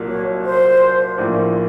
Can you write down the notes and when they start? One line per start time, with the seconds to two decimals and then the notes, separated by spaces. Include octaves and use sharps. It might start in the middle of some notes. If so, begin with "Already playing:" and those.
Already playing: C2 A#2 F#3
0.09 C#5
0.45 C5
1.18 A#1 A2 F3 A#3